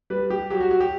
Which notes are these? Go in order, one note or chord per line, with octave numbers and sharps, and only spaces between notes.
G3 B4
G3 G4
F#3 G4
F#4
F#3 F#4
G4